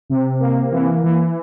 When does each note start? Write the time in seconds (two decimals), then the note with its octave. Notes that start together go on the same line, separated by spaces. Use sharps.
0.10 C3
0.40 A#3
0.72 E3
1.04 E3